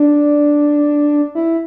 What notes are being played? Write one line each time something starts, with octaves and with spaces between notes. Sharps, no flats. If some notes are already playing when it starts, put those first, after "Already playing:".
Already playing: D4
E4